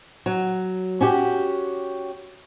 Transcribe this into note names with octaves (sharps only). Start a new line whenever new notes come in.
F#3
C#4 F#4 G4